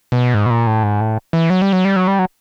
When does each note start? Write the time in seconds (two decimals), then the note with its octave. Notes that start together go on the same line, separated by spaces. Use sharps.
0.12 B2
0.34 G#2
0.46 B2
0.50 A#2
0.67 A2
0.83 G#2
1.01 A2
1.33 E3
1.50 F#3
1.62 G3
1.73 F#3
1.85 G3
1.96 F#3
2.08 G3
2.19 F#3